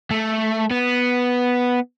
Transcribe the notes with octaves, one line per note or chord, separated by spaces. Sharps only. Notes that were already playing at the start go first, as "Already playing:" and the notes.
A3
B3